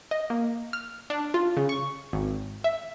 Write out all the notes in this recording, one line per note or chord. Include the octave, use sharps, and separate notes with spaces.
D#5
A#3
F6
D4
F4
C#3
C#6
G#1
E5